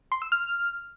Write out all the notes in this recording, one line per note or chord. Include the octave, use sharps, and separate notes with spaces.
C6
E6
F6